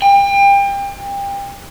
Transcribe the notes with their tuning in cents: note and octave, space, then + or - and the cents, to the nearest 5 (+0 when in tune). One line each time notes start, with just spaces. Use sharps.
G5 +30